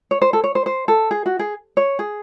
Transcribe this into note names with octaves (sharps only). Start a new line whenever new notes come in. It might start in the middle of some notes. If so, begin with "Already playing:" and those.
C#5
C5
A4
C#5
C5
C5
A4
G#4
F#4
G#4
C#5
G#4